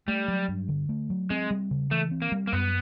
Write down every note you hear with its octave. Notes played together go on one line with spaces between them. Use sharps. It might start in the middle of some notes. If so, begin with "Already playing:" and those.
G3 A3
F#3
G2
D3
A3
F#3
G#3 C4
G3
C#3
E3 A3
C4
A#3
G3
A#3
F#2 B3